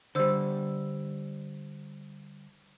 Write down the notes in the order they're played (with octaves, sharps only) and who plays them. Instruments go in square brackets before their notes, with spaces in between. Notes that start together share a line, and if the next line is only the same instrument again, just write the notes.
[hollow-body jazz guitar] D3 G3 [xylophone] C5 E6